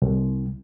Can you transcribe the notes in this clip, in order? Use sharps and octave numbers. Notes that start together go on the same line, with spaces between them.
C2